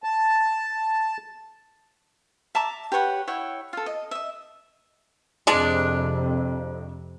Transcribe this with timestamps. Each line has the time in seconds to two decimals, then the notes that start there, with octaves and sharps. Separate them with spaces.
0.04 A5
2.55 E5 A5 A#5 D6
2.92 G4 B4 C#5 F#5
3.27 E4 C#5 F#5 G5
3.73 F4 A4
3.86 D#5
4.11 D#5 E5
5.47 F2 C3 G#3 D4